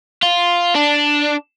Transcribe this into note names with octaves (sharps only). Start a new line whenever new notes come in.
F4
D4